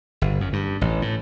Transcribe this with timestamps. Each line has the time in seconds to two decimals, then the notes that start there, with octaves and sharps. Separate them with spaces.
0.22 G1
0.41 F#2
0.53 G2
0.81 A1
1.02 A2